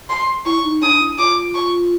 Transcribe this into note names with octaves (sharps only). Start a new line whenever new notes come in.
C6
E4 C#6
D#4
D4 D#6
E4
F4 D6
C#6